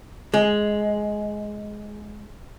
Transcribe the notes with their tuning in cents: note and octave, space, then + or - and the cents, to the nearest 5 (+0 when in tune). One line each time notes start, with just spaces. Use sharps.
G#3 +10